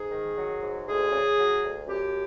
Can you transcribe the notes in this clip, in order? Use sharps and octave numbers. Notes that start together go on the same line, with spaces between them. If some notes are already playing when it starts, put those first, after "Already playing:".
Already playing: G#2 G#4
D#3
F#3
G#2
D2 G#4
C#3
F#3
D2
F#2 G4